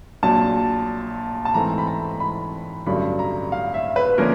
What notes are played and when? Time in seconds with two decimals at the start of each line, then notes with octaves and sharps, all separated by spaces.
0.23 A#1 A#2 F#3 A5
1.45 A5
1.54 G#2 E3 A3 C4 A#5
1.78 B5
1.87 A#5
2.20 B5
2.86 A1 G2 D3 F#3 B5
3.19 A#5
3.52 F5
3.74 E5
3.96 B4
4.18 D3 F3 A#3 C#4 A#4